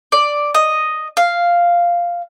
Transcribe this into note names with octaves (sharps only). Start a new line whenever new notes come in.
D5
D#5
F5